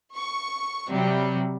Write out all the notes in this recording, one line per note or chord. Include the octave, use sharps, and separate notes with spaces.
C#6
C3 F#3 G3